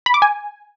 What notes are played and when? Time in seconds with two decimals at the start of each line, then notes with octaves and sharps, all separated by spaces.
0.06 B5
0.14 D6
0.22 G#5